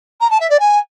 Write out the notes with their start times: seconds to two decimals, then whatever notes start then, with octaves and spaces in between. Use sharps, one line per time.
0.21 A#5
0.30 A5
0.40 E5
0.50 D5
0.60 G#5